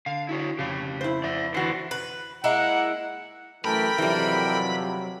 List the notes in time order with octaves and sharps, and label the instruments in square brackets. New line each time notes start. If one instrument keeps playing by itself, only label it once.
[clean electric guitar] D3 [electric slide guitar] F5
[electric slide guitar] E4 F#4 C#5
[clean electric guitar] F2 C#3 [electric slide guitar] G4 F5
[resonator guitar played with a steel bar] E4 C5
[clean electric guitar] F2 [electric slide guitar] D5 E5
[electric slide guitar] D3 [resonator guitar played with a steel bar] E3 F#4 [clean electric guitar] B3 E4 C5
[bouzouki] B4
[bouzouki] G#3 A#3 E4 [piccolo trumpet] F#5
[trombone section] F#2 E3 A3 [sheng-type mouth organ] A4 A#4 G5 [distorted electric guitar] B5
[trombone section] F2 C3 F#3 [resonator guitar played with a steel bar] E3 G3